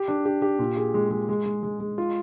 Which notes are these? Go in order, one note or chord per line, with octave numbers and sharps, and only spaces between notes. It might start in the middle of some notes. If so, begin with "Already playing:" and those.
Already playing: G4
D4
G4
G4
A#2
G#4
G#3
G#3
G#3
G#3
G#3
G#3
F4